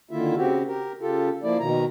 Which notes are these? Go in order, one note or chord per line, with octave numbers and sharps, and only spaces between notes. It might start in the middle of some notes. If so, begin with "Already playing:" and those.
D3 D#3 A#3 E4 F4 E5
C#3 C4 F#4 G4
G4 A#4
C#3 F4 G4 A4
F3 A#3 E4 D5
B2 D#3 A#5